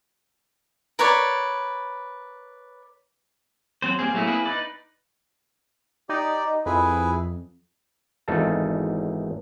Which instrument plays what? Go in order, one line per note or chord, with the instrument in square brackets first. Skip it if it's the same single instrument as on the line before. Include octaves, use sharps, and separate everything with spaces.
[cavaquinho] A#4 B4 C#5 D5
[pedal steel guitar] F#3 C4 C5
G3 A#3 C4 G#4
F#3 A3 A#3 E4 G#4
A#3 C4 E4 G#4 B4
D#4 B4 D5
[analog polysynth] D#4 [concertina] G4 D5
[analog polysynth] F2 [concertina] E4 G#4 B4
[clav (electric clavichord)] G#1 E2 D#4 A4 F5 A5